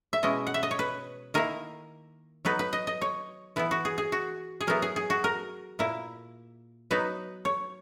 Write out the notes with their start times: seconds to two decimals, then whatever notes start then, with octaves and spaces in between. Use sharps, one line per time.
0.13 E5
0.23 B2 G#3 C#4 E4 D#5
0.47 F#5
0.54 E5
0.63 D#5
0.71 C#5
0.79 B4
1.34 D#3 A#3 E4 A#4
2.45 F#3 B3 D#4 B4
2.59 B4
2.73 D#5
2.87 D#5
3.02 C#5
3.56 E3 B3 E4 B4
3.71 F#4
3.85 G#4
3.98 G#4
4.12 F#4
4.61 G#4
4.67 F#3 B3 E4 A#4
4.82 G#4
4.96 G#4
5.10 F#4
5.24 A#4
5.79 A#2 A#3 E4
6.91 F#3 B3 D#4 B4
7.45 C#5